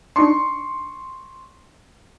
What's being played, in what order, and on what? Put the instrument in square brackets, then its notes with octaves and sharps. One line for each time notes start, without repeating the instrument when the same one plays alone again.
[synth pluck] D4 D#4 [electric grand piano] C6 C#6